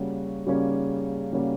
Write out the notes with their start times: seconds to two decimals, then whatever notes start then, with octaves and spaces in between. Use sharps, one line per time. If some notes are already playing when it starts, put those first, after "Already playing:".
Already playing: C#3 G3 A#3 C#4 F#4
0.47 C#3 G3 A#3 C#4 F#4
1.33 C#3 G3 A#3 C#4 F#4